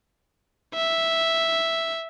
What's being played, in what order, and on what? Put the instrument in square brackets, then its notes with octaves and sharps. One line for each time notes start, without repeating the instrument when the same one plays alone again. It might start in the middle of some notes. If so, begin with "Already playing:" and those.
[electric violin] E5